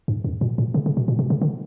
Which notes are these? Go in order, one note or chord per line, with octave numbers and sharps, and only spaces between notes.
G2
F#2
A#2
A#2
C#3
C#3
B2
A#2
B2
C#3
D3